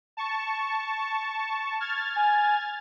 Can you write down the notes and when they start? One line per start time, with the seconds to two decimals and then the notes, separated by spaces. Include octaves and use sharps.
0.17 A5 C#6
1.80 F6 G#6 A6
2.16 G#5